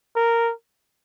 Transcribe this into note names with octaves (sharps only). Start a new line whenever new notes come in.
A#4